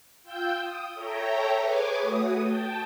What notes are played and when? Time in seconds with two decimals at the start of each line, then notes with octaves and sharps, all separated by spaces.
0.23 F4 G5 E6 G6
0.58 D#6
0.94 A4 C#5 E5 G5 A#5
1.56 G#4 B4 C#5 G#5 D6
1.98 A3 F#4 D#6
2.41 G5 A5